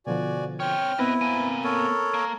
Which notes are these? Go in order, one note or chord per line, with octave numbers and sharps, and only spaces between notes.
B2 D3 F3 F#4 D5 G#5
C4 C#5 G5 F6
B3 C4 E4 B4 D#5
A#3 G#5 B5
A4 A#4 C#5
A#3